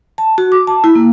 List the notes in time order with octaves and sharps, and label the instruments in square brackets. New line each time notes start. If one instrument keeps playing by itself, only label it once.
[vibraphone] A5
F#4
D6
A5
E4
A#3